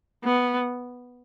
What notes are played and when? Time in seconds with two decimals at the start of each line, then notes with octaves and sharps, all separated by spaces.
0.24 B3